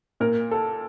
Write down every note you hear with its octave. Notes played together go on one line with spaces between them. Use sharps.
A#2 A#4
A4